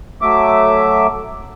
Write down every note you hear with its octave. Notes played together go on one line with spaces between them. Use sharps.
F#3 A3 E5 D6